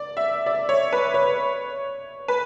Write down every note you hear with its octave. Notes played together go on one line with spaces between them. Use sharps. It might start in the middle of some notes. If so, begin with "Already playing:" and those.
Already playing: D5
E5
D5
C#5
B4
C#5
B4